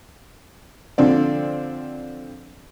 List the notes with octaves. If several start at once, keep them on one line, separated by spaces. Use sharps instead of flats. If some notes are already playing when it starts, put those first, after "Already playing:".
D3 F3 C4 D5